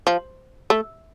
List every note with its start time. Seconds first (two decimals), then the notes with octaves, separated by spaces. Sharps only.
0.07 F3
0.70 A3